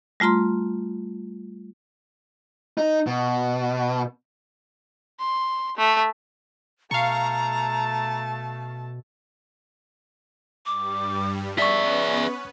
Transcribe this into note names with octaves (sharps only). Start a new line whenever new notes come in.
G3 A3 F4 A#5 C6
D#4
B2
C6
A3
B2 A3 F5 A5 A#5 C#6
G2 G3 D6
B3 C#4 G#4 B4 D5 E5 C#6 B6